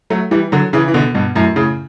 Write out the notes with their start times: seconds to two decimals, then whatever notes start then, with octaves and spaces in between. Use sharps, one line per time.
0.10 F#3 A3
0.31 E3 G3
0.52 D3 F#3
0.73 C#3 E3
0.88 E3
0.94 B2 D3
1.15 G2 B2
1.35 F#2 A2
1.56 A2 C#3